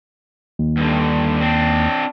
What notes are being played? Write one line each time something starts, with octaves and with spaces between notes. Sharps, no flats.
D#2
G2 D3
C4 D4